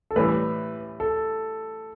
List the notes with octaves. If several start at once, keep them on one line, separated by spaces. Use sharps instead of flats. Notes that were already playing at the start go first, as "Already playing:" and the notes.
A4
A2 E3 G3 B4
A4